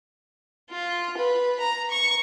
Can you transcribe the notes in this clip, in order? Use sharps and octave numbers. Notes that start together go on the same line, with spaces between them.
F4
B4
A#5
C#6